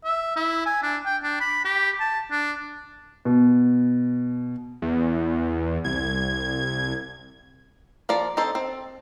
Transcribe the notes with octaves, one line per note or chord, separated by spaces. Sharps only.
E5
E4
G#5
D4
G5
D4
B5
G4
A5
D4
B2
E2
C2 G#6
F3 A#3 D5
C4 D#4 A4 C5
C4